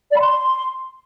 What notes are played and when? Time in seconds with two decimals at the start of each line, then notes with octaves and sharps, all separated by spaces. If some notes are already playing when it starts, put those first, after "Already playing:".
0.11 D5
0.16 B5
0.21 C6